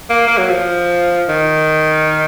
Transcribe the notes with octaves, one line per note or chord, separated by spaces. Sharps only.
A#3
A#3
F#3
F3
D#3